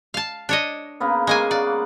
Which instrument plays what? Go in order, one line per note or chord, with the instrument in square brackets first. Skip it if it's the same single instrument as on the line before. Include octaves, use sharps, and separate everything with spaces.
[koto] F5 A5
D4 C#5 D#5
[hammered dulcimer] C#3 A#3 B3
[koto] G#3 A#3 G#5 [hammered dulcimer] C#6
[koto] D5 [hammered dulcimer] F#5